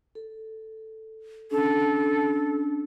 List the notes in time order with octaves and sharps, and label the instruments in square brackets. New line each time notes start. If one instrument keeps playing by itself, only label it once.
[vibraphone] A4
[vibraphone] C#4 D4 [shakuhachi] A4